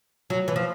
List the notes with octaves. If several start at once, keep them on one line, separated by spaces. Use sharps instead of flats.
F#3
E3
F3